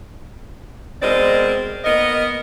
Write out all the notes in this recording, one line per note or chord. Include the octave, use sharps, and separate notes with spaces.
B2 G#3 C4 A#4 D5 D#5
A#3 B3 A#4 D#5